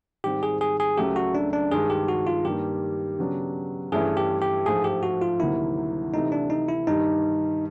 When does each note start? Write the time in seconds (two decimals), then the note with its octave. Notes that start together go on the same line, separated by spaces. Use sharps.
0.24 G#2 D#3 G3 C4 G4
0.43 G#4
0.61 G#4
0.80 G#4
0.97 C#2 C#3 F#3 A3 G4
1.16 F#4
1.35 D4
1.53 D4
1.71 G2 D#3 G#3 G#4
1.90 G4
2.08 F#4
2.27 F4
2.45 G2 D#3 G3 A#3 G4
3.19 C#3 F#3 B3 D4
3.92 G2 E3 A3 C#4 E4 G#4
4.17 G4
4.41 G4
4.66 G#2 F3 A3 G#4
4.84 G4
5.03 F#4
5.22 F4
5.39 D2 C3 D#3 F#3 A#3 E4
6.14 C3 E3 A3 D#4
6.32 D4
6.50 D#4
6.68 E4
6.87 G2 D#3 G3 D#4